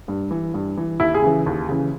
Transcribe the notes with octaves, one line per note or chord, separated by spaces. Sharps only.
G2
E3
G2
E3
D#2 E4
G#4
C#3 E3
D#2
C#3 E3